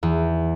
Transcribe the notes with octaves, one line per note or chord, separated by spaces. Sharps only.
E2